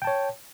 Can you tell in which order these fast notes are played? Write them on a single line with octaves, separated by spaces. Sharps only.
G5 A5 C#5